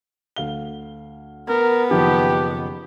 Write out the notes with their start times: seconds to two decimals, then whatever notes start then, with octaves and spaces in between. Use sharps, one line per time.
0.36 D2 F5 G7
1.48 B3 A#4
1.91 F#1 D#3 F3 G4